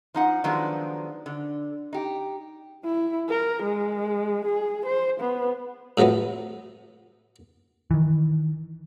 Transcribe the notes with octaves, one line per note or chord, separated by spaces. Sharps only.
F3 D#4 F#5
D#3 F3 F#3 G#3 B3 D4
D3
D#4 G4
E4
A#4
G#3
G#4
C5
B3
A2 C3 F3 F#3 B3
D#3 E3